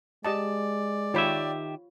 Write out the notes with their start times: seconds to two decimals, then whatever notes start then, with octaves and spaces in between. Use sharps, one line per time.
0.25 G#3 G4 D5 D#5 A5
1.14 D#3 F4 G4 C#5 E5 B5